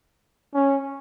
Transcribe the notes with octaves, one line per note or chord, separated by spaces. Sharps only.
C#4